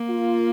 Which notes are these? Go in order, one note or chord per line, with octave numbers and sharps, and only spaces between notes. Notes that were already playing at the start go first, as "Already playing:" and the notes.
Already playing: A#3
F4